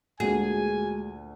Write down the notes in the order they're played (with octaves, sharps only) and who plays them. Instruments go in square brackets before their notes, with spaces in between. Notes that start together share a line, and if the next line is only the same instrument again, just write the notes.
[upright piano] D2 A#2 [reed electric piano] G#3 F#4 [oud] G#4 [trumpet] G#5